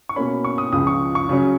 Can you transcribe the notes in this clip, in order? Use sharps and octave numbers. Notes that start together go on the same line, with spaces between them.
C#6
B2 A#3 C#4 B5
C#6
D#6
C#2 C#3 F3 D#6
C#6
C#6
C#3 F#3 C#4